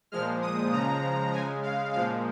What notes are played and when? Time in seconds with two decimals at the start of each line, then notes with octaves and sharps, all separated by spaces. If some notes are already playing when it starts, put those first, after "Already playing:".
0.12 A#2 F3 G#3 F6
0.42 D#6
0.72 C#3 F3 G#3 A#5
1.33 C#3 G#3 G#5
1.63 F5
1.93 A#2 F3 G#3 F5